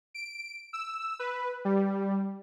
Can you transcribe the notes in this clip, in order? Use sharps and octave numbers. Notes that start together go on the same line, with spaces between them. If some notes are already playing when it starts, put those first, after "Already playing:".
D7
E6
B4
G3